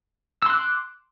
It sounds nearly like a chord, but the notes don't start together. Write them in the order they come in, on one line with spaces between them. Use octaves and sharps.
E6 C6 F#6 D6